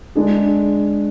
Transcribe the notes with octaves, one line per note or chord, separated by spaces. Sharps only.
G#3 D4 G#4